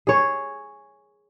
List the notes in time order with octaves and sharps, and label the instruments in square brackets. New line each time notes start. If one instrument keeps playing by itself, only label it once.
[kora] G#4 C#5